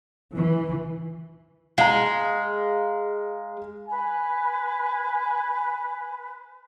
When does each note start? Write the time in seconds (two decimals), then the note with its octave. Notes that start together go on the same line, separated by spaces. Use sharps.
0.35 E3
1.78 G#3 F5 A#5
3.88 B4 G#5